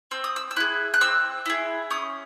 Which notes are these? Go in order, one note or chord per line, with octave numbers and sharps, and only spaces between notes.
C4 E6
D#6
E6
E6
E4 G#4 F#6
F#6
C4 E6
E4 G#4
C#4 D#6